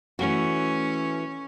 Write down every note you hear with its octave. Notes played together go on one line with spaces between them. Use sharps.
E3 A3 C#4 F#4